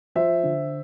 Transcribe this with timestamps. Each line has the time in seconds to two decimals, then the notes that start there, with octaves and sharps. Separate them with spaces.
0.15 F3 C5 E5
0.43 D3